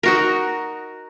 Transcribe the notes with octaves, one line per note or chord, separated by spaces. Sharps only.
D#4 F#4 A#4